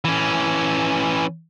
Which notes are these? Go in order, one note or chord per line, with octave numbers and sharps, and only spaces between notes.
E3 C#4